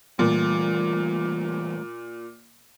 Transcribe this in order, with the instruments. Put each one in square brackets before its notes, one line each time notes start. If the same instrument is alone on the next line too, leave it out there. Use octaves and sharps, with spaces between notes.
[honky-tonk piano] A#2 [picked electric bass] E3 G3 A3